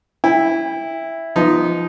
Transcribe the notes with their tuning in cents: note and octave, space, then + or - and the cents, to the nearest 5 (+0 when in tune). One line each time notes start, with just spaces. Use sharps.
E4 +0 G5 +35
F3 -20 B3 +0 D#4 +0